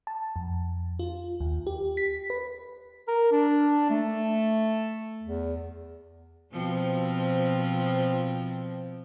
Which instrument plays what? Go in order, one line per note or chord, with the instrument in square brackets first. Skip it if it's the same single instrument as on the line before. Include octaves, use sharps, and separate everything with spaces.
[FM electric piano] A5
F2
F4
D#2
G4
B6
B4
[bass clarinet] A#4
D4
A3
E2
[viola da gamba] B2 F3 C4